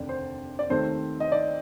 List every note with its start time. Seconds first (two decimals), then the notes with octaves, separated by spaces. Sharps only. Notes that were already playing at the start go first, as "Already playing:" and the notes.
Already playing: F1 D#2 D3 D5
0.09 C5
0.59 D5
0.70 D#2 D#3 A3 C4 C5
1.20 D#5
1.32 D5